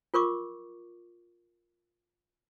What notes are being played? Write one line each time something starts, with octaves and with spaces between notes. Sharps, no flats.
F4 A#4 C#6 D6